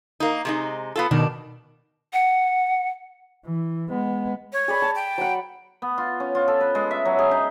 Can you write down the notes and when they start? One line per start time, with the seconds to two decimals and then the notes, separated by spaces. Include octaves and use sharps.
0.20 A#3 D#4
0.45 C3 G#3 D#4
0.96 B3 F4 A4
1.11 B2 D#3 D4
2.13 F#5
3.46 E3
3.90 G#3 B3
4.53 C#5
4.68 G#4 D5 B5
4.82 A5
4.95 G5
5.18 F#3 F#5
5.82 B3
5.98 F4
6.20 C#4
6.35 F4
6.48 A4
6.61 B4
6.75 G#3
6.91 E5
7.05 F#3
7.19 G#4
7.31 D#4